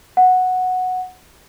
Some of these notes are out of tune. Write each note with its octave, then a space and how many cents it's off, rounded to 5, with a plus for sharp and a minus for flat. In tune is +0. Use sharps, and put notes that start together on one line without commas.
F#5 -5